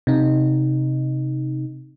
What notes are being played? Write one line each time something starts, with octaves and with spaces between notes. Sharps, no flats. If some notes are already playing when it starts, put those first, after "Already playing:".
C3 D#4